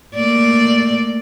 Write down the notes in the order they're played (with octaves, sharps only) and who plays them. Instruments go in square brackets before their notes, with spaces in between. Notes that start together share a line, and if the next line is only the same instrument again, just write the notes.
[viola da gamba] A3 A#3 D5